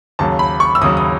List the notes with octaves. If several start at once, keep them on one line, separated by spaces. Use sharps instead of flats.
D#2 C#3 F#3 A5
B5
C#6
E6
D#2 C#3 F#3 D#6
D#6